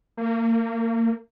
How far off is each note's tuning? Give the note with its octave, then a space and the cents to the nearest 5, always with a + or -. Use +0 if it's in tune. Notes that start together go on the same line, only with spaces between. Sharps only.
A#3 -30